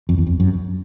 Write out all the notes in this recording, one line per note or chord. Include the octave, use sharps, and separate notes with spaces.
F2
E2
F2
F#2